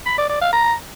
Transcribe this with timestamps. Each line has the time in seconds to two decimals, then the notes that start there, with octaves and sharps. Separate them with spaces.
0.06 B5
0.18 D5
0.29 D5
0.41 F5
0.53 A#5